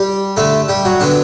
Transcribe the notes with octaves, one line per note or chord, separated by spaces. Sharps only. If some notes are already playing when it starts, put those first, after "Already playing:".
Already playing: G3 G4
D3 A3 A4
G3 G4
F#3 F#4
D3 F#3 B3 D4